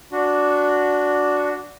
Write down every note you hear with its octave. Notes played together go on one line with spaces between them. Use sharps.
D4 F#4